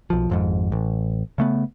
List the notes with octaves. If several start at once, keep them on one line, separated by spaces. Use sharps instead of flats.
B1 F3
G#1 F2 G#2
A1
C#3 A3 B3